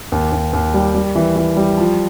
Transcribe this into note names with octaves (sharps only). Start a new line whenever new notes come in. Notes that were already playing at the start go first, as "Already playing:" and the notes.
D#2
D#2
D#2
G3
G3
E3
E3
G3
F3